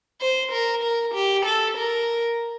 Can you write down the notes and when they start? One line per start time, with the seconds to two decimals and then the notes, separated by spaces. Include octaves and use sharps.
0.21 C5
0.52 A#4
0.83 A#4
1.14 G4
1.45 A4
1.78 A#4